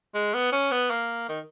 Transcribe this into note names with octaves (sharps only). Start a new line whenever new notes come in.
G#3
B3
C#4
B3
A#3
D#3